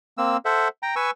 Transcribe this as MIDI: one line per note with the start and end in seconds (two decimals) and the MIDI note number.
0.18 0.37 58
0.18 0.37 60
0.18 0.37 88
0.45 0.68 69
0.45 0.68 72
0.45 0.68 76
0.45 0.68 78
0.83 0.95 79
0.83 0.95 82
0.96 1.11 71
0.96 1.11 80
0.96 1.11 85
0.96 1.11 88